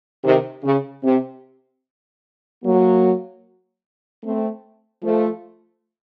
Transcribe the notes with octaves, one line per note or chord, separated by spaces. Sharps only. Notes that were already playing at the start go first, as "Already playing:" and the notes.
C3 D#3
C#3
C3
F#3 A#3
A3 C4
F3 A3